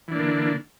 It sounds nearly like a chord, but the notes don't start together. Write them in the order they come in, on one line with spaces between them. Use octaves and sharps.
E3 D4 A#3 D3